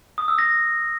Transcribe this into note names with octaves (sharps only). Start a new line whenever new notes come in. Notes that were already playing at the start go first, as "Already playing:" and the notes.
D#6
E6
A#6